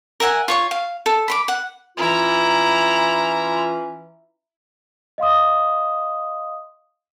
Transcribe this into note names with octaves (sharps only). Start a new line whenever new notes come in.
A#4 E5 F#5 G#5
F4 C#5 C#6
F5
A4
B5 C6 D6
F#5
E3 C#4 E4 F4 A#5
D#5 F5 C6 D#6